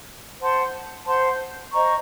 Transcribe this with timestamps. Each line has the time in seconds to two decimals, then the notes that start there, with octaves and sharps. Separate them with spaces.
0.40 C5 F#5 A5 C6
1.06 C5 F#5 A5 C6
1.72 C5 D#5 A#5 C#6